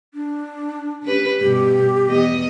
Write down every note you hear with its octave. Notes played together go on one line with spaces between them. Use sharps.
D4
C#4 G4 B4
G2 B2 G4
E2 B3 D#5